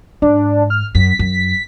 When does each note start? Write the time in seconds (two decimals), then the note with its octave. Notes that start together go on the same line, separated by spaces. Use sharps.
0.22 G#2 D4
0.70 F6
0.95 F#2 B6
1.19 F#2